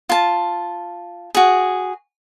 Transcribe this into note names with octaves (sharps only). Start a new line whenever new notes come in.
F4 A5
F#4 G#4